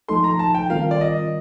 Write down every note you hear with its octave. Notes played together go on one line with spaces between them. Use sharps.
F3 A3 D#4 A4 C6
A#5
A5
G5
D#3 G3 C4 F4 A#4 F5
D5
D#5